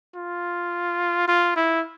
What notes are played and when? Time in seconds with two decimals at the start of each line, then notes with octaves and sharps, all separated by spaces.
0.15 F4
1.28 F4
1.56 E4